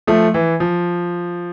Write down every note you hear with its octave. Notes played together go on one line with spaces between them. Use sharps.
F3 A3
E3
F3